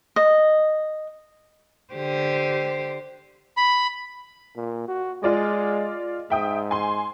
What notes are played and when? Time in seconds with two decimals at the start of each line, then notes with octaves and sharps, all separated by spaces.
0.16 D#5
1.94 D3 G4 C5
3.57 B5
4.57 A#2
4.88 F#4
5.23 G#3 F4 D5 D#5
6.30 G#2 E5 G5 D#6
6.71 G#5 C6